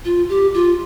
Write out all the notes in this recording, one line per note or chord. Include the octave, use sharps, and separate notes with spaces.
F4
G4
F4